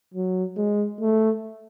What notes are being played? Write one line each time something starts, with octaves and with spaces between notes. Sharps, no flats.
F#3
G#3
A3